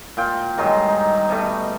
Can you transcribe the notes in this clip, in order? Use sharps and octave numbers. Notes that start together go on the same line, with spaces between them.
A#2 F4 G5
G2 D#3 F#3 G#3
D#4
B2 G3 A3